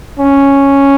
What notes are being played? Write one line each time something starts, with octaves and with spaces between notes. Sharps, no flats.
C#4